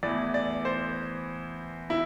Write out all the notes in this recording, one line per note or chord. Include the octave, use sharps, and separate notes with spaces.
E2 E3 A3 D5
D5
C5
E4